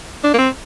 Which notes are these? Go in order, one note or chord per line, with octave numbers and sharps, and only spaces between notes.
D4
A#3
C4